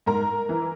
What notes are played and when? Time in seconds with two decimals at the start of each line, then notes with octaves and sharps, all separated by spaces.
0.06 G#2 A#4 A#5
0.49 E3